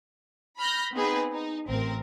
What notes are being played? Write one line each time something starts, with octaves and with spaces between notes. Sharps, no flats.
B5 F6 G6 A#6
B3 C4 D#4 G#4 B4
D#4
A1 C4 A#4